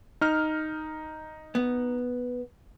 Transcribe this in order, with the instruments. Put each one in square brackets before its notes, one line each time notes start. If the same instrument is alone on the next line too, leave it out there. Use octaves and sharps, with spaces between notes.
[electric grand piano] D#4 F6
[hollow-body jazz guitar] B3